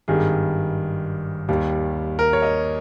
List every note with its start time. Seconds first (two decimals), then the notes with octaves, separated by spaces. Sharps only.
0.08 G#1 G2 D#3 G3 G#4
1.49 D#2 D#3 G3
2.19 A#4
2.33 C#5
2.42 D#5